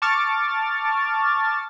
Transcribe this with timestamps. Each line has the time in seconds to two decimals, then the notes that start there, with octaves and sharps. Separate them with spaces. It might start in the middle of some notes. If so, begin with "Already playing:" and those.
0.02 A5 C#6 D6 F6 A6